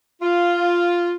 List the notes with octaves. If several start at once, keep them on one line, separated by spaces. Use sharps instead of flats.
F4